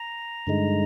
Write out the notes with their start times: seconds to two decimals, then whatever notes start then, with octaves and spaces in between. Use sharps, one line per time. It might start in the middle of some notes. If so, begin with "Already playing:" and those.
Already playing: A#5
0.47 G2 D3 G#3 D#4